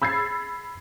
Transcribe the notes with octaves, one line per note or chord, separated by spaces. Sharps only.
B5 E6 G#6 A6 C7